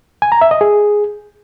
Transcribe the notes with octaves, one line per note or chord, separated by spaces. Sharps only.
G#5
A#5
E5
D#5
G#4